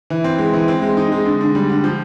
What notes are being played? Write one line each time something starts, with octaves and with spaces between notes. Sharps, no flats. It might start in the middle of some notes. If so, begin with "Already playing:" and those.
E3
C4
G#3
E3
C4
G#3
D#4
G#3
D3
D3
G3
D3
F3